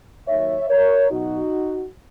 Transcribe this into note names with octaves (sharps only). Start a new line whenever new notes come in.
D#2 D#3 F#3 C#5 E5
A#4 C#5
B1 B2 F#3 D#4 F#4